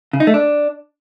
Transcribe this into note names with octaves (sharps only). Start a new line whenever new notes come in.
C#3
D#4
A3
D4